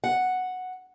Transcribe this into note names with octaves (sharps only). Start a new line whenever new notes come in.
F#5